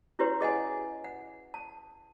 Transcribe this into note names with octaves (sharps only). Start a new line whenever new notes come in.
C#4 E4 F#4 G4 B4 C#5
G#4 D#5 F#5 G#5
F#5
A5